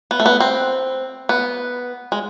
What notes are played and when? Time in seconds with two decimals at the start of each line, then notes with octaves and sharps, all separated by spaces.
0.11 B3
0.20 A3
0.26 B3
0.40 C4
1.29 B3
2.12 G#3